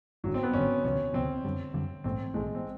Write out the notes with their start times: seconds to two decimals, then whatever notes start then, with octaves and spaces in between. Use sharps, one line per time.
0.24 G#1 G2 D3 F#3
0.34 C4
0.43 B3
0.54 G#1 G2 D3 C#4
0.84 D2 C3 F3 C#4
1.13 D2 C3 F3 C4
1.45 F#2 D3 G3
1.74 F#2 D3 G3
2.04 A#1 G#2 E3 A3 C4
2.34 A#1 G#2 E3 G#3 A3
2.55 C4